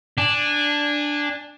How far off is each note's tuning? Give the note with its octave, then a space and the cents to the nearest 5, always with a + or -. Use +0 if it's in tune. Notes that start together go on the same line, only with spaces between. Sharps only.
D4 +0 G#5 -20